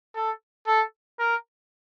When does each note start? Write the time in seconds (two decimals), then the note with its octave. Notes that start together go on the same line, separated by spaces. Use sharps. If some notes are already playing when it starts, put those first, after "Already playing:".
0.15 A4
0.67 A4
1.19 A#4